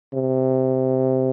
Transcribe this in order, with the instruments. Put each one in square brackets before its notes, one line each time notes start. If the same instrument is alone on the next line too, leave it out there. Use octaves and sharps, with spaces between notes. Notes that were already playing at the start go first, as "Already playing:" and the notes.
[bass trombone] C3